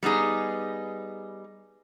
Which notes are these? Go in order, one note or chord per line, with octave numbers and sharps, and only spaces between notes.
G3 B3 D#4 G#4